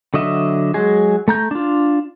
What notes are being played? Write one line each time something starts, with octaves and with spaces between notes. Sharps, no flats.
D3 F#3 D#5 E5
F#3 G#3 G#4
A3 A#5 G6
D4 F4